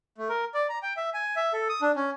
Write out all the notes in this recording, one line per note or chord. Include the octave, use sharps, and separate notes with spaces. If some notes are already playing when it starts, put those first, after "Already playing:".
A3
A#4
D5
A#5
G5
E5
G#5
E5
A4
D#6
D4
C#4